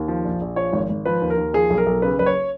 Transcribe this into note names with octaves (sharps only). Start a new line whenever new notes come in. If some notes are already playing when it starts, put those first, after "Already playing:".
Already playing: D#2
F3
A#1
A#1
F3 C#5
G#1
G#1
F3 B4
D#2
A#4
D#2
F3 G#4
B1
A#4
B1
C#3 B4
F#1 B4
C#5